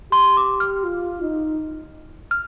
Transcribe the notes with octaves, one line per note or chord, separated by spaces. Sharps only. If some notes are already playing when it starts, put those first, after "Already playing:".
G4 C6
D6
F6
F4
D#4
F6